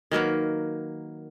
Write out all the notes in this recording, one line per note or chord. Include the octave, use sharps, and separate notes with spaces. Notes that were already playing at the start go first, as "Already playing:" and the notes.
D#3 F#3 A#3 B4